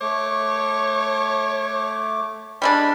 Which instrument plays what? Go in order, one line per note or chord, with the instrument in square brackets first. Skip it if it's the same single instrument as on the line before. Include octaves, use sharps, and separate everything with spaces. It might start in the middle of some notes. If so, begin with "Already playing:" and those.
[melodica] A3 D6 [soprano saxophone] C#5
[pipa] G3 G#3 D4 [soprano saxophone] B5